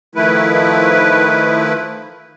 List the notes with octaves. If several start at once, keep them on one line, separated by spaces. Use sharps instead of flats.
D#3 F3 A3 E4 B4